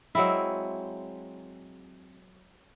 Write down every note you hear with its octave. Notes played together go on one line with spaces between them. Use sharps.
F#3 G#3 C4 E4